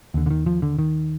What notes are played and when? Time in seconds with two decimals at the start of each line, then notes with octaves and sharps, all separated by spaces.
0.14 D#2 D3
0.26 D3
0.30 D#3
0.46 F3
0.62 D3
0.79 D#3